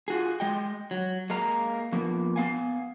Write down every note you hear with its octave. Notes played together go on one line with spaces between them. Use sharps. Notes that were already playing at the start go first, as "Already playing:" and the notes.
F4 F#4 G#4
G#3 D#5 G5
F#3
G#3 A#3 F5 A#5
F3 A#3 B3
B3 F5 G#5